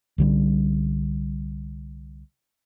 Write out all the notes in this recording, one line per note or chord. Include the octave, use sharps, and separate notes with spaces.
C2 D3 G3